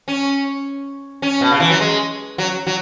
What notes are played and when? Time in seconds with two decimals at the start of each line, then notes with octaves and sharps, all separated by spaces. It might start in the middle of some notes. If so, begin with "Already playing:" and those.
0.08 C#4
1.22 C#4
1.41 B2
1.51 C#3
1.60 E3
1.70 F#3
1.80 G#3
2.38 F#3
2.67 F#3